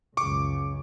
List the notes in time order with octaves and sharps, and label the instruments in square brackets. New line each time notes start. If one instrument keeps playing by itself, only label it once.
[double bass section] C#2 F#2 C#3 [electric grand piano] C#6 D6